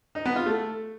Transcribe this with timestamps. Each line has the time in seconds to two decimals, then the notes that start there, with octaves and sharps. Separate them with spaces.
0.15 D#4
0.25 B3
0.36 F4
0.46 A3